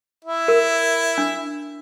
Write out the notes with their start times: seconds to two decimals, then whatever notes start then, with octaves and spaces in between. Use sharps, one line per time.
0.25 E4 E5
0.48 A#4
1.18 D4